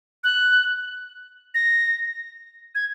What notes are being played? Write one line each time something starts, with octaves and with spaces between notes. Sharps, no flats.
F#6
A#6
G#6